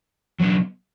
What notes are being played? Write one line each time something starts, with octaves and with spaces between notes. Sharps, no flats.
F#3 B3 D4